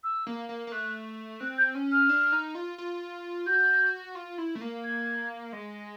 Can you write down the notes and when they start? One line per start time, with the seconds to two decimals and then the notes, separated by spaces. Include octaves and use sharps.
0.03 E6
0.27 A#3
0.49 A#3
0.67 A#3
0.72 A3 F#6
1.40 C4 F#6
1.58 G6
1.75 C#4
1.91 F6
2.09 D4
2.32 D#4
2.55 F4
2.78 F4
3.46 F#4 G6
4.15 F4
4.38 E4
4.55 A3
4.61 A#3
4.84 G#6
5.53 G#3